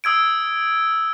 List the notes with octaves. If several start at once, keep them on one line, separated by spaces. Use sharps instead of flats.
D#6 E6 G#6 D7